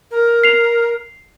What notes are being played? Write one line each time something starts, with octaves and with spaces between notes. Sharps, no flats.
A#4
C7 F7